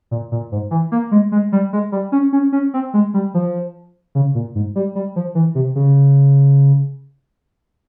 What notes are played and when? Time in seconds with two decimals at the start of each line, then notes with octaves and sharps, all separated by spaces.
0.11 A#2
0.32 A#2
0.52 G#2
0.71 E3
0.92 A#3
1.11 G#3
1.32 G#3
1.52 G3
1.73 G#3
1.92 G3
2.12 C#4
2.33 C#4
2.52 C#4
2.74 C4
2.94 G#3
3.14 G3
3.34 F3
4.15 C#3
4.35 A#2
4.55 G#2
4.75 G3
4.95 G3
5.16 F3
5.35 E3
5.55 C3
5.75 C#3